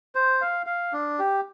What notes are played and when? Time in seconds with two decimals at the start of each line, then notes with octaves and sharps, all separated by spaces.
0.15 C5
0.41 F5
0.66 F5
0.93 D4
1.19 G4